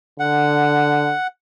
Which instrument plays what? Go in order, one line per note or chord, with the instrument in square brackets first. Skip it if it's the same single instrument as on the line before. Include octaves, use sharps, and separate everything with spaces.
[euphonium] D3 [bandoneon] F#5